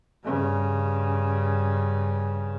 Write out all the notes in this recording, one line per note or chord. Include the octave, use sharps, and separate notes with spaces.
G2 C#3